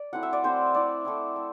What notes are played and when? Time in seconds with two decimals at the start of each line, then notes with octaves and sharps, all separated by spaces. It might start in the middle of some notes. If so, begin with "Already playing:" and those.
Already playing: D5
0.13 F#3 A3 C4 E4 F#5
0.23 E5
0.33 D5
0.44 F#3 A3 C4 E4 C5
0.74 A3 C4 E4 D5
1.05 A3 C4 E4
1.36 A3